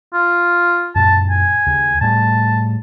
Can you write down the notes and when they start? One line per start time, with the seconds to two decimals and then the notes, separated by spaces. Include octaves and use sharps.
0.13 F4
0.95 F#2 A#2 A5
1.30 G#5
1.67 D#2 C#3
2.01 A2 G3 A3 A5